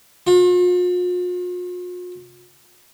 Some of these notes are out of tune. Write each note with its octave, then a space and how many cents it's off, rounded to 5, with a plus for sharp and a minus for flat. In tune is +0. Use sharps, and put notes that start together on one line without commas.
F4 +45